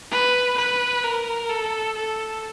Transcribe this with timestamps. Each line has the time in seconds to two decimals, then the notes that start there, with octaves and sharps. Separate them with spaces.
0.11 B4
0.58 B4
1.04 A#4
1.50 A4
1.96 A4